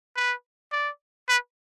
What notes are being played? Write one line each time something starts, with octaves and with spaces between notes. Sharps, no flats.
B4
D5
B4